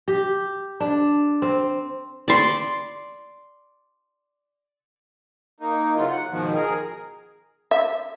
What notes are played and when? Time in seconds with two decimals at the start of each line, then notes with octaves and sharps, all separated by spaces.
0.08 G4
0.80 D4
1.42 C4
2.28 D5 C6
5.60 A#3 D#4
5.96 C#3 E3 F#3 F4
6.11 F#5
6.30 G#2 B2 D#3 F3
6.55 G#4 A#4
7.71 E5